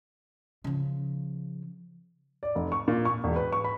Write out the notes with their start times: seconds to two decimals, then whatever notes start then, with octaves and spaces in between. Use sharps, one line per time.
0.64 C#3 F3
2.43 D5
2.55 F1
2.72 C#6
2.88 A#2
3.05 C#6
3.24 E1
3.36 B4
3.52 C#6
3.64 B5